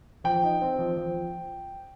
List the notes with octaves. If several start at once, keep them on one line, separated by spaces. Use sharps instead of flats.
F3 G5
D#4
C4
F3
F3